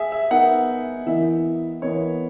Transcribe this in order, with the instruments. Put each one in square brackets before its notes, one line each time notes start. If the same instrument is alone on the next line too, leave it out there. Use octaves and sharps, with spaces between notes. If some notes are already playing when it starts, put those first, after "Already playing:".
Already playing: [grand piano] G#4 E5
E5
[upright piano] B3 D#4 A#4 E5 [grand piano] F#5
[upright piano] E3 B3 E4 A#4 D#5 [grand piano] E5
[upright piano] E3 B3 E4 A#4 D#5 [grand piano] C#5